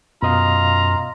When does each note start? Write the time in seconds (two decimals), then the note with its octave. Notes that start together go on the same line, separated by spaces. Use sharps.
0.22 F#2 B2 F4 D#5 F5 A#5